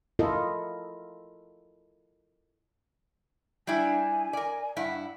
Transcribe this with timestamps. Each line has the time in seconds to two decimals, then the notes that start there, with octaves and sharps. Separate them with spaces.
0.19 E4 F4 A4 A#4 D#5
3.67 G3 D4 E4 G#5
4.33 A#4 D5
4.76 G2 E4 F#5